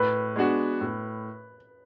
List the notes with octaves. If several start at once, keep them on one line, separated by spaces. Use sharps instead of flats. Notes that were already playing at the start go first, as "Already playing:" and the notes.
Already playing: A2 B4
G#3 B3 D4 F#4
A2